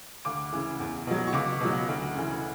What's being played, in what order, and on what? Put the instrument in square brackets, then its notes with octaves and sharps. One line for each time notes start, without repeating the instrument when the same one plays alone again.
[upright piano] D2 D6
C#3 E3
E2
B2 F#3
C#6
C#2 D6
B2 F#3
D2
C#3 E3